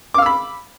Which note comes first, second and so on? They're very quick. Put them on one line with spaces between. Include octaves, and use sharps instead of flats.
D6 F5 E6 B5